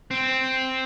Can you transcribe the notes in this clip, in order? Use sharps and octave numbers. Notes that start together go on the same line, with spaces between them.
C4